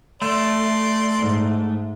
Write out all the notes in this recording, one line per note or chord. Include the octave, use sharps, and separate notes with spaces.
A3 D5 C6
G#2